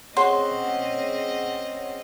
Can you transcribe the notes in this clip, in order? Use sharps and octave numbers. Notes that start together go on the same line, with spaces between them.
C4 C#4 G#4 C#5 D#5 F#5 C6